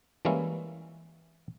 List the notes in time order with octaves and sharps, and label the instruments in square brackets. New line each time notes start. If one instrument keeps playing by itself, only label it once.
[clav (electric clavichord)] E3 G3 G#3 A#3 C#4 E4